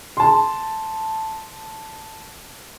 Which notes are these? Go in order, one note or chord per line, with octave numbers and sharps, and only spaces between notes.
A5 C6